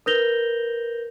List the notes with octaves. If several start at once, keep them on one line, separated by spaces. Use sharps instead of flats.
A#4 B4 G6 A#6 F7 G7